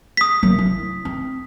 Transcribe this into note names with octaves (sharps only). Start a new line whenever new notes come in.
D#6 B6
F#3 A#3
E4
C4